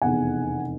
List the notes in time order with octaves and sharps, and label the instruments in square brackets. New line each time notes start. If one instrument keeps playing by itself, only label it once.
[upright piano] F1 E2 B2 F#5 G#5